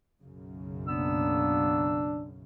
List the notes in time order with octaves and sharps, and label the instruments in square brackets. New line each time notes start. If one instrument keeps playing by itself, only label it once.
[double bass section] B1 F#2 C#3
[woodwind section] A#3 B3 E6 [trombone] D4